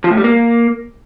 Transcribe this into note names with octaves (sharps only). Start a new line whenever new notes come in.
F3
A2
G3
A#3